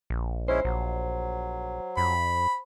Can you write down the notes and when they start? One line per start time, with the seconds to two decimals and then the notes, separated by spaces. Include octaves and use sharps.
0.10 A#1
0.48 G#3 C#4 E4 C5
0.65 A#1 F#3
1.97 F2 B5